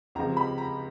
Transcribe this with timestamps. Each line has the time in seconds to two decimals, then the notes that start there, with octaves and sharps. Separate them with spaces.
0.15 C#2 C3 F3 G#3 A#5
0.37 B5
0.58 A#5